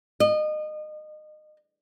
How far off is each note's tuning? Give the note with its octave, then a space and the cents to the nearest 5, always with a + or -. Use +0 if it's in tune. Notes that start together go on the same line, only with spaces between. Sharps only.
D#5 -30